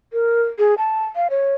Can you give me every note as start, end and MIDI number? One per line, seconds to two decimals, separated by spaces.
0.13 0.44 70
0.59 0.74 68
0.78 1.04 81
1.15 1.28 77
1.30 1.55 73